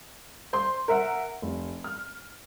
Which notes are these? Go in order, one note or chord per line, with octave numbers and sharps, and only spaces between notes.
C5 C6
A#4 E5 F#5
F1
F6